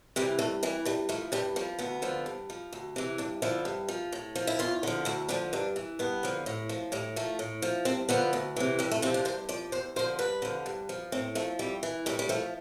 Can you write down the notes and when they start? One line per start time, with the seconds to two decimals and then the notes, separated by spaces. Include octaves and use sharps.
0.16 C3 E3 G3
0.39 G2 A3
0.63 E3 G3
0.85 G2 G3
1.09 F3 A3
1.32 G2 G3
1.56 F3 G3
1.79 D2 B3
2.02 D3 F3
2.26 G2
2.50 F3
2.73 D2
2.96 C3 E3
3.18 G2 D4
3.42 D3 F3 E4
3.65 G2
3.89 F3
4.12 A2
4.36 F3
4.47 E4
4.59 E2 F4
4.83 D3 F3
5.05 D2 E4
5.29 D3 F3 D4
5.53 G2 D4
5.76 E3
5.99 G2 B3
6.23 D3 F3
6.46 A2
6.69 F3
6.92 A2 G3
7.16 F3 A3
7.39 A2
7.62 F3
7.85 G2 C4
8.09 D3 F3 B3
8.33 D2
8.56 C3 E3
8.79 F2 G3
8.91 A3
9.02 C3 F3 C4
9.14 D4
9.25 G2 C5
9.49 F3 D5
9.72 E2 C5
9.96 D3 F3 C5
10.19 G2 B4
10.42 D3 F3
10.66 G2
10.89 F3
11.12 A2 C4
11.35 F3 A3
11.59 F2 G3
11.83 E3
12.06 A2 G3
12.19 G3
12.29 F3 A3